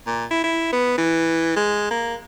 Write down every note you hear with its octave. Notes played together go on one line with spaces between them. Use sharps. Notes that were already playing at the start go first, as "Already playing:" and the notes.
A#2
E4
E4
B3
E3
G#3
A#3